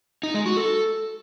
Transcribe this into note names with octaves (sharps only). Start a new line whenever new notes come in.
D#4
G#3
F#4
A4